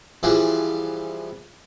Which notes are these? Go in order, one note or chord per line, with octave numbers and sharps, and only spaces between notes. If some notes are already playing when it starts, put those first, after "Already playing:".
E3 F3 G3 G#4